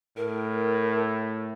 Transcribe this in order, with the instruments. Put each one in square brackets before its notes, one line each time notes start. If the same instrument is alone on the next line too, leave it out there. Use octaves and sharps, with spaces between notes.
[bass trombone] A2 [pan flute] A#4